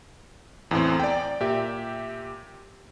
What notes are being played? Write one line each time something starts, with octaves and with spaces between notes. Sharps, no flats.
E2 A2 C4
D5 G5
A#2 G4 E5